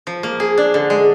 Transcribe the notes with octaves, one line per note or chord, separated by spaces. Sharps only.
F3
A#3
G#4
D4
D3
G#3